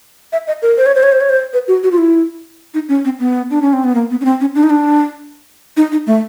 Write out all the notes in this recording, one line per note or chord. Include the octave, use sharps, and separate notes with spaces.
E5
D#5
A#4
C5
C#5
C5
C#5
C5
C#5
C5
B4
F#4
F#4
F4
E4
D#4
C#4
C4
B3
D4
C#4
C4
B3
A#3
B3
C#4
C4
C#4
D4
D#4
D4
D#4
D#4
A3